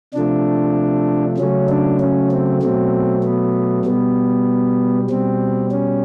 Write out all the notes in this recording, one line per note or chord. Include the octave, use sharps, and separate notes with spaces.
C3 F3 A3 D4
C#3 F#3 A3 C#4
D4
C#4
C4
B2 F#3 A3 C4
B3
B2 G3 B3
B2 G3 C4
C#4